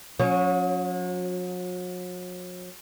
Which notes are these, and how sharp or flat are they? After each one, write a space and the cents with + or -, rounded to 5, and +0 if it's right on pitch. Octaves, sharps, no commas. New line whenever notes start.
F#3 -40 C#4 +0